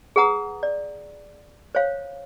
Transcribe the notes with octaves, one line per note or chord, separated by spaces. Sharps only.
G#4 B4 F#5 A#5 D#6
D5
C5 C#5 F5